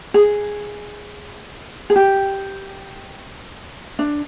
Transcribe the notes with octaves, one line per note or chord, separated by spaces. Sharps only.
G#4
G#4
G4
D4